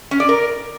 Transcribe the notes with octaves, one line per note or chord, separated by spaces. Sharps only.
C#4
D5
A#4